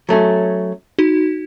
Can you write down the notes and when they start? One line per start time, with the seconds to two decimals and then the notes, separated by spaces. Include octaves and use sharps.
0.09 F#3 A3 C#4
0.99 D#4 F#4